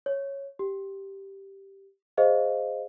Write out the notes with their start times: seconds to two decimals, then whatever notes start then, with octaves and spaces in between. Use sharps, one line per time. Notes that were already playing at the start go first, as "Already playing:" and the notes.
0.06 C#5
0.59 G4
2.17 G#4 C5 D#5 F5